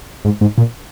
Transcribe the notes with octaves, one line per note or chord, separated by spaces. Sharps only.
G#2
G#2
A#2